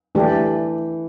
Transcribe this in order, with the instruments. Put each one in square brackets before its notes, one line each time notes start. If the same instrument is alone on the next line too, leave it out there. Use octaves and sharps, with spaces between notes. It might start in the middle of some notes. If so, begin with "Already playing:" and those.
[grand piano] E3 [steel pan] A3 D4 G4